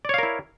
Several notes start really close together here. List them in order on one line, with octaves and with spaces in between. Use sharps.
D5 C#5 F5 A#4 E4